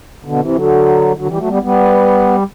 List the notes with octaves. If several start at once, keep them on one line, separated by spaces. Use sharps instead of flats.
B2 D3
C3 E3
D3 F#3
D3 F#3
E3 G3
F#3 A3
G3 B3
G3 B3